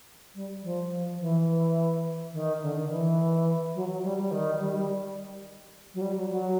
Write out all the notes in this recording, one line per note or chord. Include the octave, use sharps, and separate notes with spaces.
G3
F3
E3
D#3
D3
D#3
E3
F#3
F#3
G3
G3
D#3
G3
G3
F#3
G3
F#3
F#3